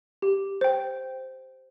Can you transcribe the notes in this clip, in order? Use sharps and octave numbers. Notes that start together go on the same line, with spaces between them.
G4
C5 G5